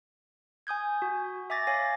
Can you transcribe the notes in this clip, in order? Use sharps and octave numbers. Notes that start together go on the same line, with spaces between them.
G#5 D#6 G6 G#6
F#4
E5 G#5 D6 A6 A#6
C#5 F5 G#5 A#6